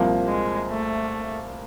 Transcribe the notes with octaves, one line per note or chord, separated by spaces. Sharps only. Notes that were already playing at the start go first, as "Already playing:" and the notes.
Already playing: C2 A#2 F3 A#3
G#3
A3